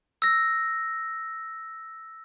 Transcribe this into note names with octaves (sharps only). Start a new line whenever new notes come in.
E6 A#6